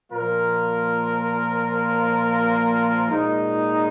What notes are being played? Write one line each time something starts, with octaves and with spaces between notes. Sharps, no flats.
A#2 F3 A#3 F4 A#4
A#2 G#3 D#4